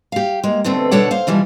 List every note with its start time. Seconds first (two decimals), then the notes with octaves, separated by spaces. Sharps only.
0.12 G4 F5
0.44 G#3 A#3
0.64 B2 D3 A3 C4
0.91 B2 D3 D4 A4 C#5 F#5
1.11 C5 F5
1.27 B2 E3 F3 G3